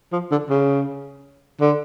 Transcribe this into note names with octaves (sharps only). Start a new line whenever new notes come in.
F3
D3
C#3
D3